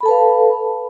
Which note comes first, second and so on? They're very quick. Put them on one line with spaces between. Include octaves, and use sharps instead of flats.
B5 A4 A5 B4 F5